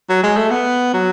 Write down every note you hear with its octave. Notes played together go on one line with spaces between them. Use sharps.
F#3
G#3
A3
B3
F#3